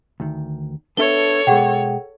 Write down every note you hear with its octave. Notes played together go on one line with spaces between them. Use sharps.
D2 D#3
B3 D4 A4 C#5 E5 G7
B2 G#3 G#4 F#5 G5